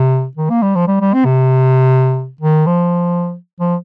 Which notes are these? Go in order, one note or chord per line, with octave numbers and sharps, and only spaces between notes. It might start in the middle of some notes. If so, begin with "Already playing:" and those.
Already playing: C3
D#3
A#3
G3
F3
G3
G3
C4
C3
D#3
F3
F3